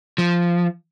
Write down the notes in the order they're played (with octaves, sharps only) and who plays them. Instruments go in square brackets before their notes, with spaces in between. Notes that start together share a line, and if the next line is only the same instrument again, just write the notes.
[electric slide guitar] F3